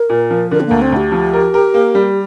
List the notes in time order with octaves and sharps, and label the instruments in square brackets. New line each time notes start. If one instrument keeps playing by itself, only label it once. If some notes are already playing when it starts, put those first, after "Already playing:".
Already playing: [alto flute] A#4
[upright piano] A#2
F3
[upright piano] D3 [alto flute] A#4
[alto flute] C4
[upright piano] D2 [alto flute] A#3
[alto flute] C4
[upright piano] D2 [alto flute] G4
[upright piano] F3
A#4
A#4
A#3
G3